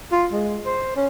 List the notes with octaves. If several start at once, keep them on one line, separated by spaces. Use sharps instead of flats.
F4
G#3
C5
C#4